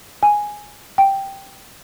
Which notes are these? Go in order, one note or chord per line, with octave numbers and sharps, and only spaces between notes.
G#5
G5